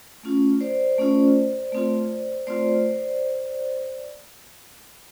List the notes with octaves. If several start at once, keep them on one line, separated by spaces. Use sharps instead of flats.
A3 C#4 F4
C5 D5
A3 C#4 F4
A3 C4 F4
A3 C4 F4 C5 D5